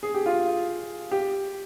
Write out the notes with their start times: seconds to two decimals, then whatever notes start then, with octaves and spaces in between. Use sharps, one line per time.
0.03 G#4
0.14 G4
0.26 F4
1.11 G4